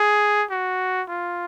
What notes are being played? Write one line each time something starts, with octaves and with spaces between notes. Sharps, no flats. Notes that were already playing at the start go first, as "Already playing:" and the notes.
Already playing: G#4
F#4
F4